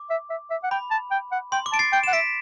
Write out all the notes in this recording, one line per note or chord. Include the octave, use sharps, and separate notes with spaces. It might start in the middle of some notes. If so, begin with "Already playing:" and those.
Already playing: D6
E5
E5
E5
F#5
G5 B5
A5
G5
F#5
G5 C6
D6
A5 D7
A6 C7
G5 D7
F#5 E7
E5 B6 D7